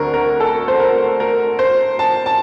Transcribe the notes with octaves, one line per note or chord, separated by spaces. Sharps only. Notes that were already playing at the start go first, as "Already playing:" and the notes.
Already playing: D2 D3 A3 C4 A#4
A#4
A4
C5
A#4
A#4
C5
A5
A5